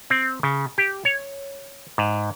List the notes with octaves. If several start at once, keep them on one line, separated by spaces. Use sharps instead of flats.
C4
C#3
G4
C#5
G#2